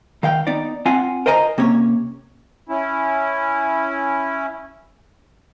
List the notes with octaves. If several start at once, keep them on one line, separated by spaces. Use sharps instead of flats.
D#3 F5 G5
B3 D#4 D5
C4 F4 F5 F#5 G#5
A#4 C5 D#5 G#5 A#5
C3 A#3 C#4 C#5
C#4 E4